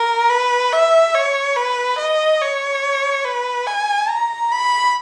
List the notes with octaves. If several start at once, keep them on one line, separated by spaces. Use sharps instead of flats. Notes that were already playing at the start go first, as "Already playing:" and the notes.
Already playing: A#4
B4
E5
C#5
B4
D#5
C#5
B4
G#5
A#5
B5